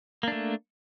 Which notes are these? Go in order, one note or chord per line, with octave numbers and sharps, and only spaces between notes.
A3 A#3 D4